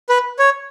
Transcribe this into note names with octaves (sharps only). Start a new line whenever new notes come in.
B4
C#5